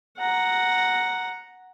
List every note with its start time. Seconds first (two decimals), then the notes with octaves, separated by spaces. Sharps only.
0.18 F#5 A#5